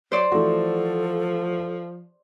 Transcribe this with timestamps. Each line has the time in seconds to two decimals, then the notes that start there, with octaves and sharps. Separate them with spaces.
0.12 F#3 C5 D5
0.32 E3 F3 A3 F#4 A4